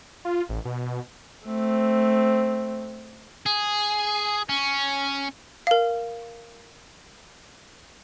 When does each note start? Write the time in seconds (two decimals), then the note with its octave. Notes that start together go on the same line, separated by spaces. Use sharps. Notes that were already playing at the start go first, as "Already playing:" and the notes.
0.25 F4
0.49 A1
0.65 B2
1.46 A3 C4
3.46 G#4
4.49 C#4
5.67 A#4 F5